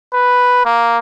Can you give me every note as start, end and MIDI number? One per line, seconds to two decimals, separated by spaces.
0.13 0.61 71
0.65 0.98 58